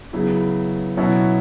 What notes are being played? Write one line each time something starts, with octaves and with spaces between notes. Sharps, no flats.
C#3 F#3 B3 E4
B2 F#3 C#4 E4